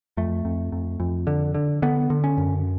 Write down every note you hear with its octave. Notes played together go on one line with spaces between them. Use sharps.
F2 A3
F2
F2
F2
D3
D3
D3 B3
D3
C#4
F#2